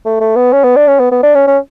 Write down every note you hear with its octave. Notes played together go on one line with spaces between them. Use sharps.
A3
A3
B3
C#4
B3
D4
C#4
B3
B3
D4
C#4
C#4